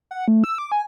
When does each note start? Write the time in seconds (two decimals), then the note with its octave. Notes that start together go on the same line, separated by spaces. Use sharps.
0.11 F#5
0.28 A3
0.44 E6
0.58 D6
0.72 G#5